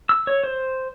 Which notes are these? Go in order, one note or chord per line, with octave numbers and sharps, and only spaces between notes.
E6
C#5
C5